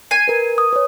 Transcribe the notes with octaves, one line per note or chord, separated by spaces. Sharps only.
G#5 C7
A#4 B4
D#6
B4 C#5